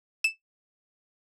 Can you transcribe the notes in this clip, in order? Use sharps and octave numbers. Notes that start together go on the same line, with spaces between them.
E7